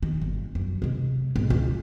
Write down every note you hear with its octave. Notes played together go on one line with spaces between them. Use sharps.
D#3
G1
F#2
C3 G#3
B1 G#2
C#2